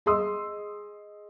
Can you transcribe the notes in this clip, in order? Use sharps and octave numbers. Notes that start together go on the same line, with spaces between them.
G#4 D#5 C6 D#6 E6